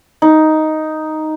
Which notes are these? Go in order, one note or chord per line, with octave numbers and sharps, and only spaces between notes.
D#4